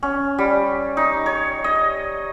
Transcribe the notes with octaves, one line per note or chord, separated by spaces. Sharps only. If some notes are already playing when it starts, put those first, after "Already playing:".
C#4
G3
D#4
C#5
D#5